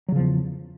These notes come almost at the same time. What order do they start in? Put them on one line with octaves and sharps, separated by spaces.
F#3 C#3 F3 E2